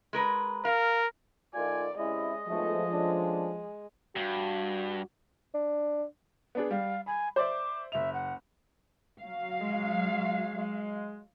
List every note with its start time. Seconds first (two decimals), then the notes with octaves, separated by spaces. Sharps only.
0.13 G#3 A#4 B4
0.65 A#4 F5
1.55 D#3 A3 F4 D5 G#5
1.98 C3 G#3 C#4 E4 D#5
2.47 B1 F3 G#3 A3
2.90 A3 C#4 D4
4.16 G2 F#4
5.54 D4
6.55 B3 D4 G#4
6.71 G3 F5
7.06 G#5 B5
7.36 C5 D5 E5 D6
7.92 F#1 E5 F7
8.13 F#5
9.21 F#3 F5
9.62 G#3
10.57 G#3